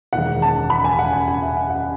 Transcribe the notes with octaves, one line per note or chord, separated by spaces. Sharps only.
E1 E2 D#3 G#3 F#5
A5
B5
G#5
F#5
G#5
G#5
E5
F#5
F#5